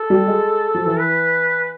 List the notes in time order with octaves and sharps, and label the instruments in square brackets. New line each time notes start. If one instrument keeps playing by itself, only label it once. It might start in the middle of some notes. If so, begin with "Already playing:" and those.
Already playing: [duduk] A4
[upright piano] G3
G#3
F3
E3
[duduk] B4